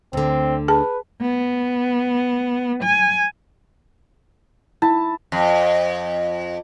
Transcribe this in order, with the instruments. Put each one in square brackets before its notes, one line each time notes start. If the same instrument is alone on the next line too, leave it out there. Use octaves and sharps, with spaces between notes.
[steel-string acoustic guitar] D2 D3 [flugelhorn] C4
[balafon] G#4 A5 [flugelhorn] B4
[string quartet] B3
G#5
[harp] E4 [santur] A5
[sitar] F2